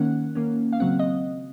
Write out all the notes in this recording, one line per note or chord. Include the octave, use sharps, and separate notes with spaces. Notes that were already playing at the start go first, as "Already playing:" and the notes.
Already playing: D#3 A#3 C#4 F#5
D#3 A#3 C#4
F5
C#3 F#3 C4 F#5
D#5